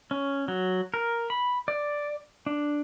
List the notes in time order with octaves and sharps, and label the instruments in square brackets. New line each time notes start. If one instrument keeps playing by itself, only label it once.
[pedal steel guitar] C#4
F#3
A#4
B5
D5
D4